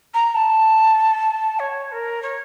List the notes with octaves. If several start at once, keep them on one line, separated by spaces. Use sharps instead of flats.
A#5
A5
C#5
A#4
C#5